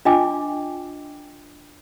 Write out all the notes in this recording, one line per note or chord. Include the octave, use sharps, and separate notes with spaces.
D4 F4 D#5 G5 G#5 D6